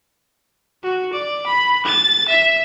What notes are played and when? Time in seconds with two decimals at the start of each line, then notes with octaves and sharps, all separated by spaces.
0.83 F#4
1.13 D5
1.47 B5
1.85 A6
2.28 E5